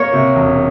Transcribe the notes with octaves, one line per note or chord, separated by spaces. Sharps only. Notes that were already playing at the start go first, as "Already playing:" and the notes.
Already playing: A#3 C#5
C3
E1